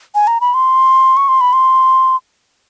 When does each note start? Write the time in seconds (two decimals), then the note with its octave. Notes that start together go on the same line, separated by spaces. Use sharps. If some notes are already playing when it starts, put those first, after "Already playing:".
0.15 G#5
0.27 A#5
0.41 B5
0.54 C6
1.17 C#6
1.28 C6
1.41 B5
1.53 C6